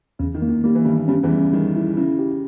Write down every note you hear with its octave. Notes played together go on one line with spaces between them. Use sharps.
E2 C#3
D#3
A#3
D#3
G3 A#3
E3
G2 D#3 G3
G2 G3 C#4
E2 E3
G3
C#3
D#3 G3
E4
C#3 E4
G4